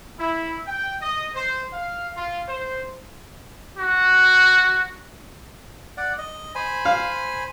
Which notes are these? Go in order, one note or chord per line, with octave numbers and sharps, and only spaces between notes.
E4
G5
D#5
C5
F5
F4
C5
F#4
D5 F#5
D#5
C5 G#5 B5
F5